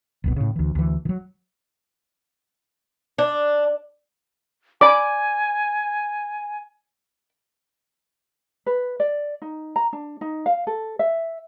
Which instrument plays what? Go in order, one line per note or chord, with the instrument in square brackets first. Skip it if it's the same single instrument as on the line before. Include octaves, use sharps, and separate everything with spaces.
[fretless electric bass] F1 C2 B2
A2 C#3
D2 E3
D2 E3
D#3 F#3
[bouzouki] D4
[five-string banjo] D5 B5 [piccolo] G#5 [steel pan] D6
[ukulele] B4
D5
D#4
A#5
D4
D#4
F5
A4
E5